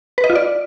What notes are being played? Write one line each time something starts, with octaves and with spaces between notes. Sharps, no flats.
B4
D#5
F4
D5